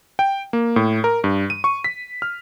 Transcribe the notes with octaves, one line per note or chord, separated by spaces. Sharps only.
G5
A#3
A2
A#4
G2
D#7
C#6
B6
F6